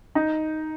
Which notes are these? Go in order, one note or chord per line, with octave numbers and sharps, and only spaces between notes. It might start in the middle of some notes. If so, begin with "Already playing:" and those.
D#4